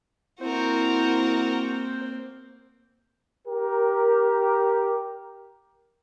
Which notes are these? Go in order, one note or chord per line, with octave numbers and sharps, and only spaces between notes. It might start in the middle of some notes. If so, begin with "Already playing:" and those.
A#3 C4 E4 F#4 A#4 C5
G4 A#4